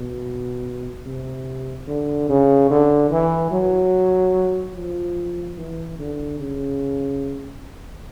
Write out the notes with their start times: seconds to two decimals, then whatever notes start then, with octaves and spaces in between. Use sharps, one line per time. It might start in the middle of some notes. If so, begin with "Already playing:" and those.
Already playing: B2
1.06 C3
1.87 D3
2.29 C#3
2.70 D3
3.10 E3
3.51 F#3
4.75 F3
5.57 E3
5.99 D3
6.39 C#3